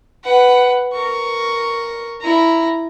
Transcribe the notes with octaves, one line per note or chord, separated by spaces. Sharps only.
B4 F#5
A#4 C#6
E4 A#5